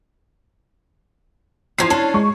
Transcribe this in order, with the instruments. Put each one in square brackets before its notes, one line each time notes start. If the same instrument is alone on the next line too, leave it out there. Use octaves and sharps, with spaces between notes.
[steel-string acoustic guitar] E2 F3 [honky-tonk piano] C6 G#6 C7
[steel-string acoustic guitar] C#4 D4 [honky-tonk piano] A5
[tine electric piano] G#3 [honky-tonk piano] C#6